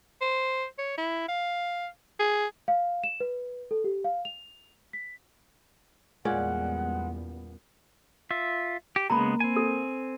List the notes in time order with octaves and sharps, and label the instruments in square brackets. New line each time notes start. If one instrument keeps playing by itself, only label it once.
[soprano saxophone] C5
C#5
E4
F5
G#4
[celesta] F5
E7
B4
A4
G4
F5
F7
B6
[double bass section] E2 G3 B3 [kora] A#2 C#4 D5 [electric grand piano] G#3 [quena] F#5
[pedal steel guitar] F4 E5
G4
[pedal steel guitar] C#3 G#3 B3 [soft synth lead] A#3 [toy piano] A#5 B5
[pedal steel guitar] C4 G#5
[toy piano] A4